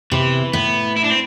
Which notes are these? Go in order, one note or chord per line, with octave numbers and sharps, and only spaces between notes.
C3 E3
A2 B3
E4
D4
C4